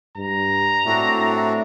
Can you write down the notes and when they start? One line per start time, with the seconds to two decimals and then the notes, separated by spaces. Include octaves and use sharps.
0.17 G2 A#5
0.86 A2 C4 D4 F#4 E5